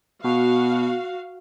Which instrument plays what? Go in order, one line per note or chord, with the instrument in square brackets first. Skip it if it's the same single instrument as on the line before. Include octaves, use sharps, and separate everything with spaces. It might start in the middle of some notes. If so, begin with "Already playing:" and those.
[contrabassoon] B2 [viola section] F#4 F5